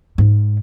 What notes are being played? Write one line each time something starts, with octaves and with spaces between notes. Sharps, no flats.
G#2